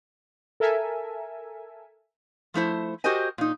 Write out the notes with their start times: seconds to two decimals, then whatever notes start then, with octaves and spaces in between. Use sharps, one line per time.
0.60 A4 A#4 E5 G#5
2.54 F3 A3 E4 C5
3.04 F#4 G4 A#4 C5 D#5 G#5
3.38 A#2 D#4